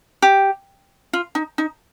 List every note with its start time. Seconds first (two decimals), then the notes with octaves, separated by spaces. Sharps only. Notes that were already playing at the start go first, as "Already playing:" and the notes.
0.22 G4
1.13 F4
1.35 D#4
1.58 D#4